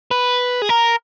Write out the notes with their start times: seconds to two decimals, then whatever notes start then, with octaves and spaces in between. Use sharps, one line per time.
0.11 B4
0.62 G#4
0.69 A#4